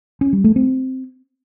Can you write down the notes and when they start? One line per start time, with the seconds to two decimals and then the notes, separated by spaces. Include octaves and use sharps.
0.21 C#4
0.33 G3
0.44 A3
0.56 C4